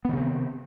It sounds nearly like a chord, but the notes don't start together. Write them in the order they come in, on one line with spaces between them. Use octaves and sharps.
B3 D#3 C3 C4